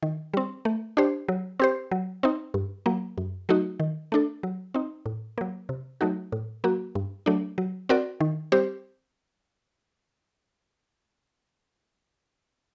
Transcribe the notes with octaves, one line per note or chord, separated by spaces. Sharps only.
D#3
G3 C4
A3
D4 G4 C5
F#3
C4 G4 C5
F#3
C4 D#4
G2
F#3 A#3
F#2
F#3 A3 D#4 F#4
D#3
A3 D4 A4
F#3
C4 D#4
A2
F#3 A#3
C3
F#3 A3 D#4 F#4
A2
F#3 A#3 F#4
G2
F#3 A3 D4
F#3
C4 F#4 A#4 D5
D#3
G3 C4 G4 C5